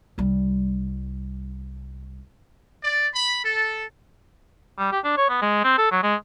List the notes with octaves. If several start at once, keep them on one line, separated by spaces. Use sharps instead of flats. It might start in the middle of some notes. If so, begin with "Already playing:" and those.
C2 G3
D5
B5
A4
G3
G4
D4
C#5
B3
G#3
C4
A4
F#3
G#3